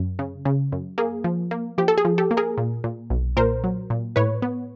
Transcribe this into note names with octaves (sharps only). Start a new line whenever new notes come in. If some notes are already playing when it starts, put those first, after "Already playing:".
Already playing: F#2
C#3
C#3
F#2
A#3 G#4
F3
A#3
F3 G4
A4
G#4
F3
G4 A4
A#3
G#4 A#4
A#2
A#2
B1
A#2 A#4 C5
F#3
A#2
A2 B4 C#5
B3